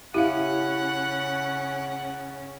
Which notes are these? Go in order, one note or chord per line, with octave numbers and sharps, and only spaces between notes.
C#3 C#4 E4 G4 F5 F#5